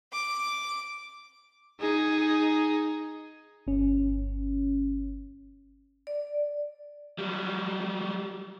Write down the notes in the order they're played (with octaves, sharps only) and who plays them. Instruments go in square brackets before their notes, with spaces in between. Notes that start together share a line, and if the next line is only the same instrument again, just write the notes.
[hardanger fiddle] D6
[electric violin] D#4 G#4
[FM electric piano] G1 C#4
[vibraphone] D5
[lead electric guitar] F#3 G3